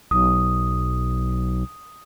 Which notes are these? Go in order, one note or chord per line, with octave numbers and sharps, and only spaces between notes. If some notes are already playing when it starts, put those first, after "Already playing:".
B1 D#6